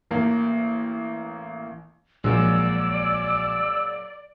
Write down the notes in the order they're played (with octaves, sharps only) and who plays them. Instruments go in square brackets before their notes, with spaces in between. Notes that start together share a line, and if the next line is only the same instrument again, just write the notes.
[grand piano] A1 A#3
[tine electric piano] A#1 [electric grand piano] A#2 F#3 G#3 [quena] D5 [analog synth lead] E6